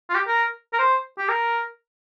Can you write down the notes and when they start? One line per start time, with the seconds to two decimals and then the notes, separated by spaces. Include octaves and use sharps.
0.09 F4
0.15 G4
0.28 A#4
0.73 A#4
0.79 C5
1.18 G4
1.29 A#4